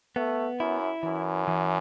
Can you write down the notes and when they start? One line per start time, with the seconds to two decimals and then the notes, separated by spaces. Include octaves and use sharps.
0.16 A3 B3
0.60 F#2 E4
1.03 F#2 E3
1.48 E3